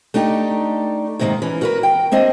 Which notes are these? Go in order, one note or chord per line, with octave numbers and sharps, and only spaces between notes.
A3 D4 D#4 G4
G#2 C3 D#3 G#3 A#3
E3 C#4
F#4 A#4 B4
G5
A#3 C4 D4 D#5